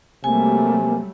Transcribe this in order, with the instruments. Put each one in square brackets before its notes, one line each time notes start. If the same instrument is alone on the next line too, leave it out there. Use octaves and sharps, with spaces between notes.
[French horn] C3 [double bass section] F#3 G3 A3 [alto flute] A#3 [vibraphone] G#5